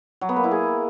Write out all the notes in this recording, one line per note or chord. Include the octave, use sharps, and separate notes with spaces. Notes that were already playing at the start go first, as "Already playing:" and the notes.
F#3
B3
A#3
E4
G#4